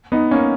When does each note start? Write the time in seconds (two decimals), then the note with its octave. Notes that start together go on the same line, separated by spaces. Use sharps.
0.12 B3 D#4
0.31 A#3 C#4